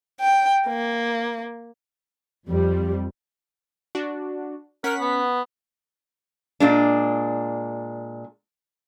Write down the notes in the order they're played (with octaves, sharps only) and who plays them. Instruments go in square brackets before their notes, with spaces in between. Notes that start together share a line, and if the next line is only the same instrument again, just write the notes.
[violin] G5
A#3
[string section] F2 G3
[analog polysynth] D4 F#4
[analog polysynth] C#4 F#5 B6 [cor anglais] A#4
[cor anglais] B3
[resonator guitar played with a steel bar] A#2 G#3 D4